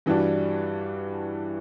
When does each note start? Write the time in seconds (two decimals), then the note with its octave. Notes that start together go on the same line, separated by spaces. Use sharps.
0.06 G2 E3 G3 D4 F#4